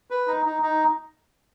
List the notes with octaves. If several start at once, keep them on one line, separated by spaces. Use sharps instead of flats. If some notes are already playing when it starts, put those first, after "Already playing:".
B4
D#4
D#4
D#4